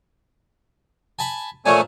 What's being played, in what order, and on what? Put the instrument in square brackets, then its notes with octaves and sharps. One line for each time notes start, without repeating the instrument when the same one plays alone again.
[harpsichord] G#5 A5 B5
[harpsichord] A#2 F3 D4 [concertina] A3 C#5 G#5